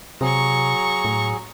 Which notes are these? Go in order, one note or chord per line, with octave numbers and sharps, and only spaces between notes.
C3 F#3 G#4 A#5 C#6
A2